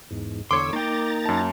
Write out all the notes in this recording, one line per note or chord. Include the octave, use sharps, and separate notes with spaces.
E2 G#2
E2 D3 C#5 C6 D6 E6
A#3 D#4 G5 A#5 A6
F#2 A5